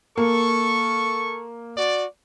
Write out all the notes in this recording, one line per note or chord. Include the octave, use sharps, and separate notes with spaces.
A#3 A4 C#6
F#4 D5